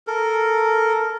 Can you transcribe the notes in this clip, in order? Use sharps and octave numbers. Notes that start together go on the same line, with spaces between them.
A4 A#4